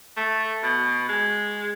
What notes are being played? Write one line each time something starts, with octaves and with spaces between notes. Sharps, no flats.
A3
B2
G#3